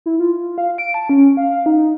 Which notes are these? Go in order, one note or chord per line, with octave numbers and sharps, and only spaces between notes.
E4
F4
F5
D7
A5
C#4
F5
D#4